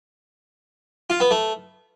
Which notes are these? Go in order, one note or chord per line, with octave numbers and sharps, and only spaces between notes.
F4
B3
A3